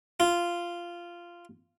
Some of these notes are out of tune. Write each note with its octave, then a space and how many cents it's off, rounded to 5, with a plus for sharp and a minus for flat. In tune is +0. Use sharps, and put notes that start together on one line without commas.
F4 -10